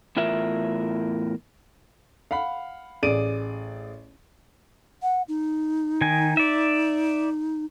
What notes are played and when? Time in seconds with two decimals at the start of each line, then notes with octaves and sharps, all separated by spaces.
0.17 E2 A2 F4 A#4 E5
2.31 F5 F#5 B5
3.03 A1 G#4 D5 D7 D#7
5.02 F#5
5.28 D#4
6.01 D#3 G#5
6.37 D5 E5